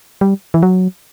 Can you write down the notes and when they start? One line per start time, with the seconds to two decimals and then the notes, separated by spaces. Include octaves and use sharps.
0.21 G3
0.54 E3
0.63 F#3